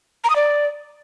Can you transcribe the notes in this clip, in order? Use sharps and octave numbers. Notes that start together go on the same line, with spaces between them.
A#5
D#6
D5